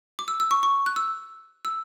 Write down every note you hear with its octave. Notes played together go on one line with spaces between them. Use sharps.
D6
E6
E6
C#6
C#6
F#6
E6
E6